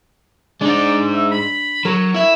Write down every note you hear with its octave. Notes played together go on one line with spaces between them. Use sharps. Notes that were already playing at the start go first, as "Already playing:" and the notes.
G#3 D4 D#4 D5
E5
B5
F#3 A#4 C#5
E4 E5